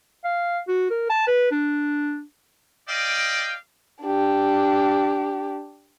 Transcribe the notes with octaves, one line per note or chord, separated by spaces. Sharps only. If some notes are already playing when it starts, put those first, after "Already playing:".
F5
F#4
A#4
A5
B4
D4
D5 D#5 F5 G5
D4 G4